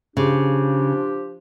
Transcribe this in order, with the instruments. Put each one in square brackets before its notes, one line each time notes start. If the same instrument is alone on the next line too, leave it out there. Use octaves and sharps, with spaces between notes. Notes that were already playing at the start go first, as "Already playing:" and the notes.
[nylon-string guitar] C#3 [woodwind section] F3 D4 G4